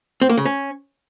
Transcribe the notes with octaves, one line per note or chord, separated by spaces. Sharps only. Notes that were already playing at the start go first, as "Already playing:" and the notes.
C4
A#3
C#3
C#4